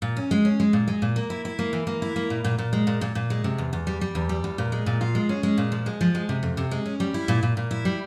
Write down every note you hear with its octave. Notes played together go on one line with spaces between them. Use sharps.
A#2
C#4
G#3
C#4
G#3
A#2
G#3
A#2
A#3
E4
E4
A#3
E3
A#3
E4
A#3
A#2
A#2
A#2
G#3
A#2
A#2
A#2
G#3
C3
E2
E2
G3
G3
E2
G3
E2
A#2
G#3
A#2
F4
G#3
C#4
G#3
A#2
F3
G#3
F3
G#3
C3
F2
C3
G#3
C#4
G3
E4
A#2
A#2
A#2
E4
G3